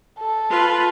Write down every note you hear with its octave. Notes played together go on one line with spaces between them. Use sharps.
A4
F4 B4